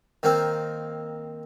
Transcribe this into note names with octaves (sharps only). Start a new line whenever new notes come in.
D#3 A#3 C4